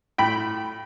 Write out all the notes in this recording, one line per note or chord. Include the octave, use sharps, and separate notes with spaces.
A2 G5 B5